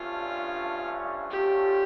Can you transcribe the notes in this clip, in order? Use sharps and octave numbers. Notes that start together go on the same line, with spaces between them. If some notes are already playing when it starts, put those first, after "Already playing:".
Already playing: G2 D3 F3 A3 C#4 F4
F2 D3 A3 C#4 F4 G4